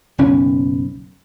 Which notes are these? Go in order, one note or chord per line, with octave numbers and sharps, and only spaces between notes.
F#1 B1 C#4